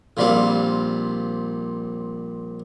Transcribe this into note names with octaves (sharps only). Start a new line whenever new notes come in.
A#1 A#2 G3 C4 F5